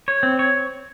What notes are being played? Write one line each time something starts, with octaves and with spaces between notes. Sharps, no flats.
C#5
C4
C#5